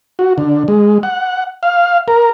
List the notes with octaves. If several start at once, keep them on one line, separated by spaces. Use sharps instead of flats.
F#4
D3
G#3
F#5
F5
A#4